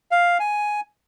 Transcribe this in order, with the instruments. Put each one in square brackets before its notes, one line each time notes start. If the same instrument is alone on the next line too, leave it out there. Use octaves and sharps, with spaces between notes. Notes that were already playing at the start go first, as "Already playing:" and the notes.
[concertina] F5
G#5